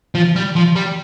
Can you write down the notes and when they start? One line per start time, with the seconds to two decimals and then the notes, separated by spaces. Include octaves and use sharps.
0.15 F3
0.36 G3
0.56 F3
0.76 G3